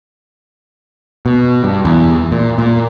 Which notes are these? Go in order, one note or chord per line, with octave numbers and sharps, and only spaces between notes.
B2
G2
E2
A#2
A#2